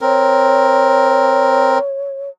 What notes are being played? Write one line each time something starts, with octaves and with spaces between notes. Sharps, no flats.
C4 A#4 C#5